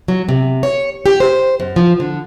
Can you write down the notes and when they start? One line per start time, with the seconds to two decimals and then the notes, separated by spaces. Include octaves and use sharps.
0.08 F#3
0.29 C3
0.63 C#5
1.06 G4
1.20 C5
1.60 F#2
1.76 F3
2.00 D3